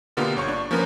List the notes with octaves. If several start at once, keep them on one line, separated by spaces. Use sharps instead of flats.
B2 D3 A#3 B3 F4 G4
G1 C#5 C#6
D4
F3 A#3 B3 C#4 A#4 B4